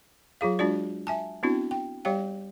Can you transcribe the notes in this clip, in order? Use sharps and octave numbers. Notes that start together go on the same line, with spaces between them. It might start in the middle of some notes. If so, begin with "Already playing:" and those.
F#3 F4 G#4 F5
G#3 D4 F4 F#4 D5
E5 G#5 A5
B3 C4 D4 E4 F#4
G5
G3 G4 C#5 F5 G5